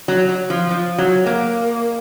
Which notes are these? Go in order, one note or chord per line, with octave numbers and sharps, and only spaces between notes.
F#3
F#3
F3
F3
F#3
A#3